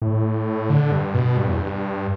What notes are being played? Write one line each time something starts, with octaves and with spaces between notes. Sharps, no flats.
A2
D3
G2
B2
G2
E2
G2